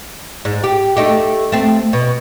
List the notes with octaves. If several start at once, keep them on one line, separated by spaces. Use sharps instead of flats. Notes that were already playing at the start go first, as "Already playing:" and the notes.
G#2
G4
A3 D#4 G4
A3 C4
B2